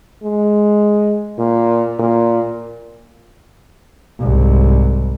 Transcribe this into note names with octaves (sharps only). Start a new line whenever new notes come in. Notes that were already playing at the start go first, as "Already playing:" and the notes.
G#3
A#2
A#2
C2 G#2